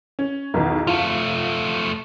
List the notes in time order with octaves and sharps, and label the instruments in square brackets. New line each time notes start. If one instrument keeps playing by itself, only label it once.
[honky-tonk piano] C#4
B1 E2 D#3
[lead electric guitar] F3 A3 [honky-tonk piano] F4